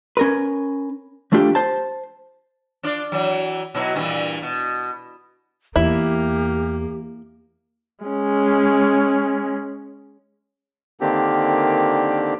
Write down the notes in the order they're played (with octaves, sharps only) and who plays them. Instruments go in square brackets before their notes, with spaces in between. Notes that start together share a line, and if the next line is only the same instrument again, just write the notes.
[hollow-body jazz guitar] C#4 A#4 B4
F3 A3 D4 F4 G4
C5 A5
[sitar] D4 F4 D5
E3 F#3
B2 F#3 E4
G2 A#2 E3
B2
[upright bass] E2 [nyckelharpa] A#3 [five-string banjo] E4 [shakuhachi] G4
[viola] G#3 C#4
[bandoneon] D3 D#3 A#3 C4 D4 G4